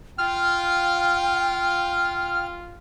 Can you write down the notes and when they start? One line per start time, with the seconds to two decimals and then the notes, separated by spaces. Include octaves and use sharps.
0.18 F4 G5 F6